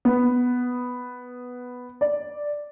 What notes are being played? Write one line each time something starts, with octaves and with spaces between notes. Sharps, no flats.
B3
D5